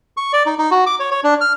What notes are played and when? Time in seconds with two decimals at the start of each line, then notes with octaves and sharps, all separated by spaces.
0.17 C#6
0.33 D5
0.46 D#4
0.58 D#4
0.71 F#4
0.86 D6
1.00 C#5
1.11 C#5
1.24 D4
1.41 F6